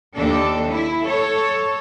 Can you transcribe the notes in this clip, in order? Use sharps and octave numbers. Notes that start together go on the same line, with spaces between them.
D#2 D4 A4
E4
A4 C#5